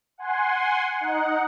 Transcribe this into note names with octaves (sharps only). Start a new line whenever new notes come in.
F#5 G#5 C6
D#4 F#5